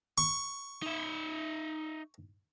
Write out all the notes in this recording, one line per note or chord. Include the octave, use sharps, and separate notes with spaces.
C#6
D#4 E5